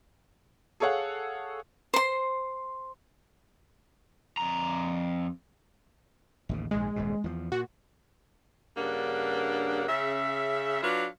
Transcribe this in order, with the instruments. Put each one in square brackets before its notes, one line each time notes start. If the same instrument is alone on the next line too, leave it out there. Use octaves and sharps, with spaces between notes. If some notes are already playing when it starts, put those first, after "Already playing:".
[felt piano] G#4 A4 C#5 F5 F#5
[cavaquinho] C5 C6
[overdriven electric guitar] F2 A#5
[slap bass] A1 D#2 C#3
[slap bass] A#1 G#2 D#3 [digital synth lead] G#3
[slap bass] D#1 G#2 B2
E2 F3
[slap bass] A#2 [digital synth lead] F#4
[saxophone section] G2 C#3 A#3 D4 F#5
C#3 E5
F#3 D4 F4 B4 F5